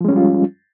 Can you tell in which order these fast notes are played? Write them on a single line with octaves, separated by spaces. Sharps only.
F3 G#3 C#4 G3 F4